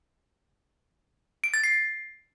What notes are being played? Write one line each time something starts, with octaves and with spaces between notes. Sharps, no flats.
D7
A6
C7